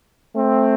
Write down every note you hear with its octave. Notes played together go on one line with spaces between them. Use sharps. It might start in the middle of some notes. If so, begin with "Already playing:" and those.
A3 C4